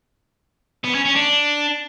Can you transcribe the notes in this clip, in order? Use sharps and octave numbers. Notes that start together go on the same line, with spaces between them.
B3
C#4
C#4
D4